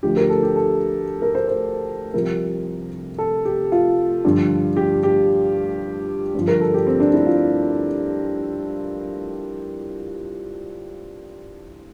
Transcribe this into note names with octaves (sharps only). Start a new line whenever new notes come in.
D2 D3 F3 G4
A#4
A4
G4
A4
A#4
C5
C5
C2 C3 F3 A#4
A4
G4
F4
G2 D3 F3
G4
G4
G2 D3 F3
A#4
A4
G4
C4
D4
E4
F4